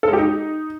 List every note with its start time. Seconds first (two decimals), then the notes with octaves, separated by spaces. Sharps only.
0.03 A4
0.08 G#3
0.13 G4
0.18 D#4